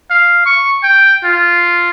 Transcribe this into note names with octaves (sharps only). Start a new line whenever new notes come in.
F5
C#6
G5
F4